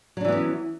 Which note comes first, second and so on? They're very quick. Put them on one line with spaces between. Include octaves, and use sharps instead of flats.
F#3 D4 E3 B3 C#4